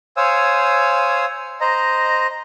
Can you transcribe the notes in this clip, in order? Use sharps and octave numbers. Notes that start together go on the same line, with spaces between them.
C5 C#5 F5 G#5 D#6 E6
C5 D#5 A#5